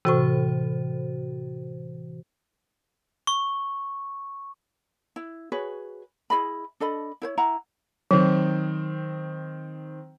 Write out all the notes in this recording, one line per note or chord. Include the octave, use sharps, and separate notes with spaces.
A2 C3 E3 F#4 C5
C#6
E4
F#4 G#4 B4 C#5
E4 G#4 D#5 B5
D4 A4 D#5 B5
E4 C5 C#5
E4 F#5 A#5
D#3 F#3 C4